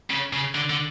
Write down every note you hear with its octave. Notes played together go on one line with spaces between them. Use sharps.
C#3
C#3
D3
D3